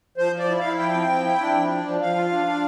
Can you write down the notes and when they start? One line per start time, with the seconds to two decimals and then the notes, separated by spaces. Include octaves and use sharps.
0.17 F3 C5
0.32 F3
0.39 D5
0.49 E4
0.59 F5
0.64 E4
0.78 F3 G5
0.95 C4
1.09 F3
1.25 E4
1.40 D4
1.56 F3
1.71 D4
1.86 F3
2.01 F3 F5
2.16 F4
2.31 D4
2.46 D4